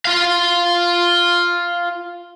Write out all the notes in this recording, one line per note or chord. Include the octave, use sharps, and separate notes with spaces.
F4 F5